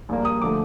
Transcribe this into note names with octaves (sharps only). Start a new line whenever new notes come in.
A#1 A#2 G3 A#3
D#6
D3 F3 A3 D6